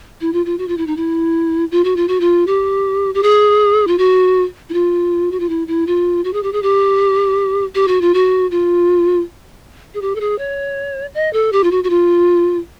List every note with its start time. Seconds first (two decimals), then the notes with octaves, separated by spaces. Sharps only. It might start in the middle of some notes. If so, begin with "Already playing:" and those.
0.21 E4
0.33 F4
0.46 F4
0.58 F#4
0.68 F4
0.77 E4
0.87 D#4
0.97 E4
1.71 F4
1.84 F#4
1.96 F4
2.08 F#4
2.20 F4
2.47 G4
3.15 G4
3.23 G#4
3.87 F4
3.98 F#4
4.69 E4
4.73 F4
5.31 F#4
5.40 F4
5.49 E4
5.67 E4
5.87 F4
6.24 F#4
6.33 G#4
6.43 G4
6.53 G#4
6.63 G4
7.75 G4
7.88 F#4
8.01 F4
8.14 F#4
8.51 F4
9.94 G#4
10.02 G4
10.15 A4
10.20 G#4
10.39 C#5
11.14 D#5
11.33 A4
11.52 G4
11.64 F4
11.71 F#4
11.84 F#4
11.90 F4